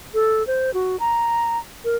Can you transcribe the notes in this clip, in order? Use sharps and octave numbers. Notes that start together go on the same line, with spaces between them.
A4
C5
F#4
A#5
A#4